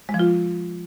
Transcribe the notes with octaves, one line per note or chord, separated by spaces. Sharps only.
G#3
F3
F4